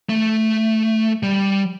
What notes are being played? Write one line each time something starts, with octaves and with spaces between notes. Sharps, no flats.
A3
G3